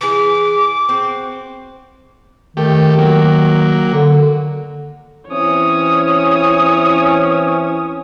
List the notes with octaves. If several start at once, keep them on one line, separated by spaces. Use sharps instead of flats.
E3 G#4 D6
C4 F#4
D#3 A3 G4
F#3 A#3
D3
E3 C4 C#4 C#5 D#6